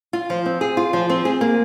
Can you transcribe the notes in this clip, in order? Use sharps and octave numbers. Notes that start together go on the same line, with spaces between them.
F4
F3
C4
G#4
F4
F3
C4
G#4
A#3